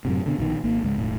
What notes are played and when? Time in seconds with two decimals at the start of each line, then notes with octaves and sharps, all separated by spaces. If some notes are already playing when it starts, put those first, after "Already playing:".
0.05 F#2 A2 C3
0.26 B2 D3
0.38 A#1 B2 D3 D#3
0.64 G#1 A#3
0.83 C#2 G#2
0.98 E1 A2